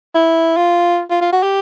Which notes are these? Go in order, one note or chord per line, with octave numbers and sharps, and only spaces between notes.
E4
F4
F4
F4
F#4
G4